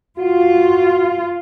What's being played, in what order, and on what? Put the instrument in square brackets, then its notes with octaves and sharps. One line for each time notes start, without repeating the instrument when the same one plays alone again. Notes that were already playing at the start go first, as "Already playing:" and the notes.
[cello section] F4 [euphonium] F#4